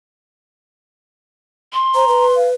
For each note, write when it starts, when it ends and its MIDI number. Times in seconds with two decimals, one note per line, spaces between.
1.73 2.35 84
1.95 2.08 72
1.95 2.26 82
2.08 2.55 71
2.36 2.49 77